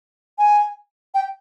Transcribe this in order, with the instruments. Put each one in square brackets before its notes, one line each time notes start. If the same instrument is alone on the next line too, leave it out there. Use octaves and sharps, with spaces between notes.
[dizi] G#5
G5